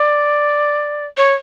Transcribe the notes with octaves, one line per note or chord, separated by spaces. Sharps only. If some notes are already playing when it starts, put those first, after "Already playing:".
Already playing: D5
C#5